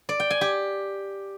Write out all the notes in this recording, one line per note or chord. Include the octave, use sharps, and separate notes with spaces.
D5
G5
G#5
G4